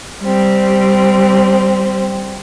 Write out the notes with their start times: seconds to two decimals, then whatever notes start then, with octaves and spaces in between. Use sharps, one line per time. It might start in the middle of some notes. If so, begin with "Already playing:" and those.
0.23 G3 C4